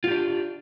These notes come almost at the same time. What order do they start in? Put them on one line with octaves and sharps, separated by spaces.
F4 G4 D4